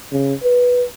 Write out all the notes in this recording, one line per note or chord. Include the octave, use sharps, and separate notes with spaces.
C#3
B4